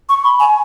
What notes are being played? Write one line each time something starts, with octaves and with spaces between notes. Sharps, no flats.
C#6
B5
G#5